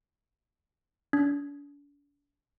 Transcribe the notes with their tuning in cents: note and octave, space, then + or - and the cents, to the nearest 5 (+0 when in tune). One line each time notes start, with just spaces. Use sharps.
D4 -40